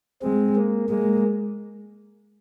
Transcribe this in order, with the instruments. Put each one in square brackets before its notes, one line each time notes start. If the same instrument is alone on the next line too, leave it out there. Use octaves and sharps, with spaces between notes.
[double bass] G#3 [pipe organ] C4
[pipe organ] A#3
[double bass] G#3 [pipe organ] A#3